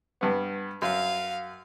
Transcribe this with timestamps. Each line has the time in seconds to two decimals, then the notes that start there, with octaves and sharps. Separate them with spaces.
0.21 G2 B3
0.82 F#2 F5